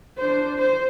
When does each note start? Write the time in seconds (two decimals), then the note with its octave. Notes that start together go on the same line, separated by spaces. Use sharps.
0.18 D4 C5
0.59 C5